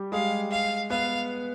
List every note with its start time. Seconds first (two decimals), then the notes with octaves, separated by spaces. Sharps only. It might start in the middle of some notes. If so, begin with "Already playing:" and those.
Already playing: G3 G4
0.12 G#3 G#4 F5
0.51 F5
0.90 B3 B4 F5